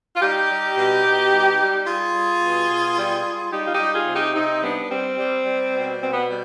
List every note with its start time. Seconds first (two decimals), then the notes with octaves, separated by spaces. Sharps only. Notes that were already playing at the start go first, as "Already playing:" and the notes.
0.16 F4
0.21 G3 D#4 G4
0.49 G3
0.76 B2
1.03 B2
1.31 G3
1.59 G3
1.86 G3 F4 G#4
2.14 G3
2.42 B2
2.69 B2
2.97 G3
3.25 G3
3.52 G3 D#4 G4
3.66 F4
3.72 D#4 G4
3.80 G3
3.93 F4 G#4
4.07 C3
4.14 D#4 G4
4.35 C3 C4 D#4
4.62 G3 B3 D4
4.90 G3 C4
5.18 G3
5.45 G3
5.73 B2
6.00 B2 C4
6.13 B3
6.28 G3